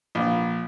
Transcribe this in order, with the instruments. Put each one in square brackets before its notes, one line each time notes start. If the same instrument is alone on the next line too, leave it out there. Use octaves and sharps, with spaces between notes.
[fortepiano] A#1